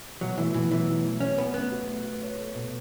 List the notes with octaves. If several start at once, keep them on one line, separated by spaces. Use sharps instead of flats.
B2 F#3
E3 A3
B2 E3
E3 F#3
B2
A3
A3 C#4
B3 B4
A3 B3
F#4
A3
B4
C#5
A4
B2